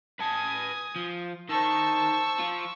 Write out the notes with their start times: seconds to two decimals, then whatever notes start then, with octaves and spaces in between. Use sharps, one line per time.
0.20 B4 G#5 A5 D#6
0.96 F3
1.49 D#3 C5 A5 C#6 E6
2.39 F3 F4